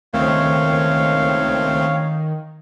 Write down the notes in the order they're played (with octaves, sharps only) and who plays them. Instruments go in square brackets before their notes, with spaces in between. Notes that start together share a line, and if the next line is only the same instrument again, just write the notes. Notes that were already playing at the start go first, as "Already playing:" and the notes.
[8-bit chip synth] C#2 A3 C4 [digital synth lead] D#3 [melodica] C#5 F5